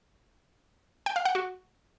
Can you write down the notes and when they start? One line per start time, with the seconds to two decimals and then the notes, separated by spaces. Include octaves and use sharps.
1.06 G5
1.16 F5
1.25 F#5
1.35 F#4